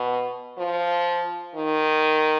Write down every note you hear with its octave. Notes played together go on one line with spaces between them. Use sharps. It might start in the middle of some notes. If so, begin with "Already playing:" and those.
Already playing: B2
F3
D#3